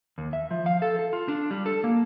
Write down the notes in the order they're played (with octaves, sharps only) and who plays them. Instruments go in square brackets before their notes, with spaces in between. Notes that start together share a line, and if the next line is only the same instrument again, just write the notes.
[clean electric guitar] D#2
E5
F3
F5
A4
A4
F4
D4
G3
A4
A#3